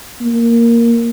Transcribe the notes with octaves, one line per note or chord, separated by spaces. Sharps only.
A#3